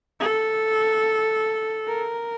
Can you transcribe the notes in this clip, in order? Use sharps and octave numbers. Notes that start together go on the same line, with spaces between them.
A4
A#4